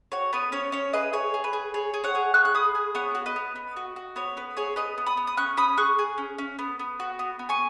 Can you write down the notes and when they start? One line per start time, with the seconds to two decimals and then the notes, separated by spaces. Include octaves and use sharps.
0.12 F#4 C#5
0.33 B3 B4
0.52 C#4 C#5
0.72 C#4 C#5
0.93 G#4 B4 D#5
1.13 G#4 C#5
1.34 G#4
1.44 B4
1.53 G#4
1.74 G#4 C#5
1.94 G#4
2.04 C#5 F#5
2.15 G#4
2.34 G#4 C#6 F#6
2.45 F#6
2.55 G#4 B5 D#6
2.75 G#4
2.95 B3 C#5 F#5
3.15 F#4
3.26 B4 D#5
3.36 B3
3.56 B3
3.76 F#4
3.96 F#4
4.16 B3 C#5
4.37 B3 B4
4.57 G#4 C#5
4.76 B3 B4 D#5
4.98 B3
5.06 B5 D#6
5.17 B3
5.27 D#6
5.37 C#4 C#6 F#6
5.57 C#4 B5 D#6
5.77 G#4 C#6 F#6
5.99 G#4
6.18 C#4
6.38 C#4
6.59 B3
6.79 B3
7.00 F#4
7.19 B3
7.39 B3
7.49 G#5 C#6